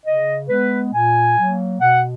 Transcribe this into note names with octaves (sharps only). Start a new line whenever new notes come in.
C#3 D#5
G#3 B3 B4
A#2 G#5
F#3 A#3
B2 F#5